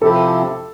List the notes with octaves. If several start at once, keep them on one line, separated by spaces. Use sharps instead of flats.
C3 F3 C4 E4 G4 A4